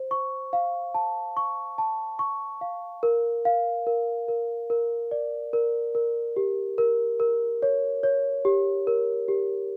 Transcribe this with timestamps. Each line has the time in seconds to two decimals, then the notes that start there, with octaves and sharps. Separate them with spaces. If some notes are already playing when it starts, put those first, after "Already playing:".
Already playing: C5
0.11 C#6
0.53 F5
0.94 A5
1.37 C#6
1.78 A5
2.19 C#6
2.61 F5
3.03 A#4
3.45 F5
3.87 A#4
4.28 A#4
4.70 A#4
5.11 D5
5.53 A#4
5.95 A#4
6.36 G4
6.78 A#4
7.20 A#4
7.62 C#5
8.03 C#5
8.45 G4
8.87 A#4
9.28 G4